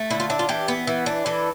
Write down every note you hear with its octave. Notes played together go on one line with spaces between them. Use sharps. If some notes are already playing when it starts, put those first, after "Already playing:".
Already playing: A3
D3 E4
F4
D4 E4
F4
E3 G4
B3
E3
D4
E3 A4